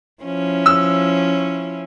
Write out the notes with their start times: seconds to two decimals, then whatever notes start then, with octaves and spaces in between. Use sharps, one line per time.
0.23 F3 C#4 E4
0.66 E6